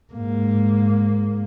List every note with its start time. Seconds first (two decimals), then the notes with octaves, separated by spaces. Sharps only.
0.13 G#2 A#3